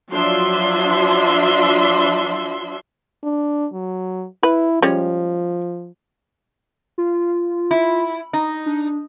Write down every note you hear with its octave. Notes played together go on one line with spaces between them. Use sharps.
F3 F#3 D4 F4 E5 C6
D4
F#3
E4 B4
F3 G3 G#3 C#4
F4
E4
D#4
D4